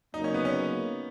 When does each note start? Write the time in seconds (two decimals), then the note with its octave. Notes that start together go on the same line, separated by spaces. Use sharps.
0.14 C#3 F#3 A#3 D#4
0.24 C#4
0.34 B3
0.45 C#4